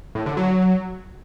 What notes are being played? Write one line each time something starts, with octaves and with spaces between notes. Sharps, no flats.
A2
D3
F#3